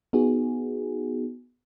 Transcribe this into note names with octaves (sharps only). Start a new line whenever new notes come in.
B3 D#4 F#4 G#4